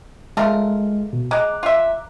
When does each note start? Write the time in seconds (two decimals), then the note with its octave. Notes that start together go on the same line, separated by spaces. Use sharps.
0.37 G#3 A3 F4 A#4
1.13 B2
1.31 G#3 A#5 D6 F#6
1.63 F4 E5